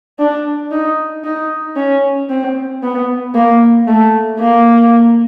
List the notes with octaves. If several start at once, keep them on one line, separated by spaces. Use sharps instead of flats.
D4
D#4
D#4
C#4
C4
B3
A#3
A3
A#3